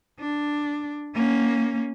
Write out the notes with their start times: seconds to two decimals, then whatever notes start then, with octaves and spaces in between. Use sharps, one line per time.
0.19 D4
1.14 A#3 C#4